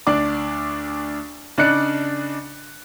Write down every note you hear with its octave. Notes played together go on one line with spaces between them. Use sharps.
D2 D4 D5 D6
C#3 D4 D#4 D5 F#6 C#7